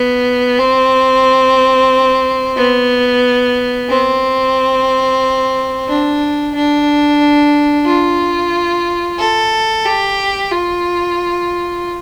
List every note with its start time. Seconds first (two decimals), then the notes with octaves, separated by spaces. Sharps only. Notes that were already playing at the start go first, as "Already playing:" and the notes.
Already playing: B3
0.59 C4
2.56 B3
3.89 C4
5.89 D4
6.55 D4
7.86 F4
9.19 A4
9.85 G4
10.51 F4